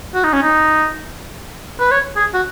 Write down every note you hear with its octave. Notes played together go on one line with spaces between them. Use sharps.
F#4
D#4
C#4
D#4
B4
C#5
G#4
F#4